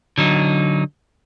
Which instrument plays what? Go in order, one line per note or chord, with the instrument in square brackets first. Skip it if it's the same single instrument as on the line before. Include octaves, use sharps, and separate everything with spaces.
[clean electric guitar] D3 F#3 D#4